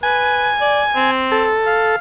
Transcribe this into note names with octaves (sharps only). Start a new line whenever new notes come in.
B4 G#5
D5
C4
A4
F5